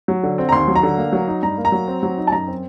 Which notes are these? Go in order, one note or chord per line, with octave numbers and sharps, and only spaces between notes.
F#3
D3
C4
A#5
D#2 C6
F#3
A#5
D3
A#3
F#3
D#4
G2 A#5
A#3
A#5
F#3
C4
F#3
D#4
A5
F#2 A#5
C4